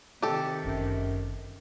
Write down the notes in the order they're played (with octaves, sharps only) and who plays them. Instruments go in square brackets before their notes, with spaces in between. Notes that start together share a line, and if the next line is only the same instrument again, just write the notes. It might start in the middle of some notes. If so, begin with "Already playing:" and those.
[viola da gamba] C3 D#3 [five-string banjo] G4 A4
[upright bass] G1 E3 [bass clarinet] F#2